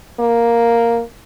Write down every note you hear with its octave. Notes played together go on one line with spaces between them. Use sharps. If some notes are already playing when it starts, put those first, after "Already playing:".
A#3